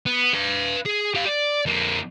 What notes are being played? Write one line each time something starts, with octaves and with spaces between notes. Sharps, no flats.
B3
B4 F5
G#4
G4 F5
D5
F2 A#3